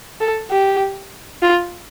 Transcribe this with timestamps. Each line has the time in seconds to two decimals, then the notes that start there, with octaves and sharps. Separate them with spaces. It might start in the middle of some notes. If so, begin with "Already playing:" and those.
0.20 A4
0.50 G4
1.42 F4